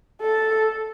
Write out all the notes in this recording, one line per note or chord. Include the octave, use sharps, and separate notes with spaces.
A4